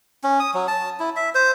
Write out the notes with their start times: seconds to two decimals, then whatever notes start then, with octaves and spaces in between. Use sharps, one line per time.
0.24 C#4
0.40 D#6
0.54 F#3
0.68 A5
1.00 E4
1.16 E5
1.35 C5